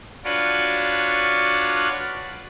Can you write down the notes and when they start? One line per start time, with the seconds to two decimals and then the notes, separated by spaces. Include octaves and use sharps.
0.24 D4 F4 F#4 B4 C#5 D5